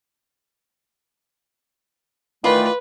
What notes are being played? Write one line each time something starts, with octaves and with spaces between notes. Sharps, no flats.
D#3 E3 A3 F4 B4 D5 B5